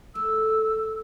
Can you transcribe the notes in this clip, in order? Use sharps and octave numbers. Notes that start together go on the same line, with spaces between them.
A3 E6